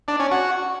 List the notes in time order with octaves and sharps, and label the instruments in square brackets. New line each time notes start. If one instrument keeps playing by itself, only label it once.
[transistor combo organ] D4
C#4
F#4